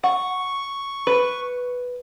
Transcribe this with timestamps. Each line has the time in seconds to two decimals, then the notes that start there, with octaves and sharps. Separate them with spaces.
0.04 F#5 C#6
1.07 B4